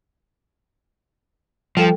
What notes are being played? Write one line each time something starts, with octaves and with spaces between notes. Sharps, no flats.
F3 G3 A4 G5